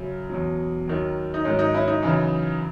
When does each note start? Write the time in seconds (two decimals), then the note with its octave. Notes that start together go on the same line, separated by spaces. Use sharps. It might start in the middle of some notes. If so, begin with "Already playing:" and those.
Already playing: F#2 C#3 F#3 C#4
0.29 E2 B2 F#3
0.87 D#2 D#3 F#3
1.34 D#4
1.45 G#2 D#3 F#3 C#4
1.59 D#4
1.74 C#4 E4
1.88 D#4
2.03 F#2 C#3 E3